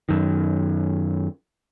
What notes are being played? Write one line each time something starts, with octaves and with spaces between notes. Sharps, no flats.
F#2 D#3